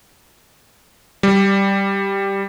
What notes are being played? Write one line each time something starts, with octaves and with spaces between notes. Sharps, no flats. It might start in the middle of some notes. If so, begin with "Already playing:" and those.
G3